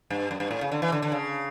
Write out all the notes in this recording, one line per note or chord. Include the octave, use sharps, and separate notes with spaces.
G2
F#2
G2
A2
C#3
D3
E3
D3
D3
C#3